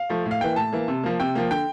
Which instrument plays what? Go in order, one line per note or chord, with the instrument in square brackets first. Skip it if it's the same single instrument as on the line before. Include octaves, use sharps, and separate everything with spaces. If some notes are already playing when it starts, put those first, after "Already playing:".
Already playing: [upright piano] F5
F3 A3
A2
F5
E3 A#3 G5
A2 A5
E3 A#3
C3
F3 A#3
C3 G5
F3 A#3
D3 G5